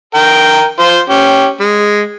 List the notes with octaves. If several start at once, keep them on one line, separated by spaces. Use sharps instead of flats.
A#4 G5
F4 C5
C#4 G4
G#3